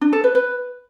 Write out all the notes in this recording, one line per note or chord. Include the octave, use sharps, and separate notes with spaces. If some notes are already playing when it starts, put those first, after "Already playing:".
D4
A4
B4
B4